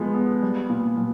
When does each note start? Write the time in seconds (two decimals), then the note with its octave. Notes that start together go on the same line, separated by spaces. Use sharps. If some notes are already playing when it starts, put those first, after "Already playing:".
Already playing: F3 G#3 B3
0.15 B3
0.42 G3
0.70 A#2
0.97 A#2